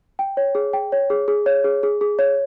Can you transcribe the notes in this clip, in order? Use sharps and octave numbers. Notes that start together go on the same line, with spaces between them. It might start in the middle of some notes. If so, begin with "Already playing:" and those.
G5
C#5
G#4
G5
C#5
G#4
G#4
C#5
G#4
G#4
G#4
C#5